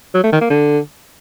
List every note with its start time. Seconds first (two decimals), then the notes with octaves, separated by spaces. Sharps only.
0.15 F#3
0.24 A3
0.33 D#3
0.41 A#3
0.50 D3